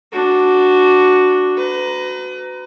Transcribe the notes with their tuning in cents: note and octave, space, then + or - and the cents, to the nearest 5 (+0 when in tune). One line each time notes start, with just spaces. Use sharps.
D4 +0 F#4 +0
B4 +35 A#5 +5